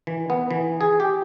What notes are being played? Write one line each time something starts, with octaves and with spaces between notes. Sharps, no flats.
E3
B3
E3
G#4
G4